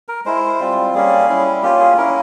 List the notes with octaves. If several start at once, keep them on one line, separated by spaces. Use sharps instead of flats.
A#4
G#3 E4 C5
G3 C4 F4
G3 A#3 C#4 G#4
G3 C#4 E4
A#3 C#4 F4 G4
G#4
A#3 C#4 E4 A#4